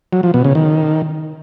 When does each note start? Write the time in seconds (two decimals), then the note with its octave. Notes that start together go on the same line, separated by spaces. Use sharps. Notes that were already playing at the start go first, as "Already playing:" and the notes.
0.13 F#3
0.23 F3
0.34 B2
0.45 C#3
0.55 D#3